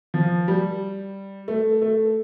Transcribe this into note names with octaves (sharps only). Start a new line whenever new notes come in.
F3
G3
A3
A3